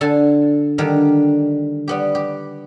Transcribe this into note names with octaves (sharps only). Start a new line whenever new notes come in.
D3 A4 G#5 A5
D3 D#3 G3
G3 B3 G4
G4